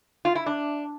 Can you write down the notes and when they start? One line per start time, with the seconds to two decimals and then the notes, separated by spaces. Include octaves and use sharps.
0.25 F4
0.35 E4
0.46 D4